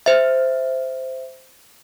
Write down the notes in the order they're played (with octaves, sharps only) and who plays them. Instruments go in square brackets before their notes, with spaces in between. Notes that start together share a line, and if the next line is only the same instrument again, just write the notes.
[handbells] C5 E5